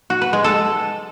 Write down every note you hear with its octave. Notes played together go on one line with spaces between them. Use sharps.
F#4
B4
G#3
A4